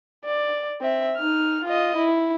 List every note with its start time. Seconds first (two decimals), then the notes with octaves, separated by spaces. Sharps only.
0.25 D5
0.82 C4 E5
1.17 D#4 F6
1.65 F4 D#5
1.97 E4